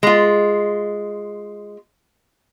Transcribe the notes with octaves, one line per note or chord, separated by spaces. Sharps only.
G#3 F4